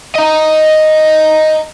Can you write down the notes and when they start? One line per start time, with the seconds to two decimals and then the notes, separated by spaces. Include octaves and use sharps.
0.15 D#5 A#5